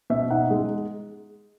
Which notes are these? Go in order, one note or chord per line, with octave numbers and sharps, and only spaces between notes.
B2 E5
D#4 F#5
G#3